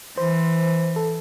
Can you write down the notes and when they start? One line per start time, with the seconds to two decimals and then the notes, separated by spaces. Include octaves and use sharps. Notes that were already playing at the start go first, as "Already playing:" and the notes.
0.17 E3 C5
0.96 A4